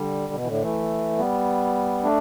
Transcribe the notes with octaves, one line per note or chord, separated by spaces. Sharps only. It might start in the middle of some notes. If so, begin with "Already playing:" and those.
Already playing: D3 G3
B2
E3
A2 D3
E3 A3
G3 B3
A3 D4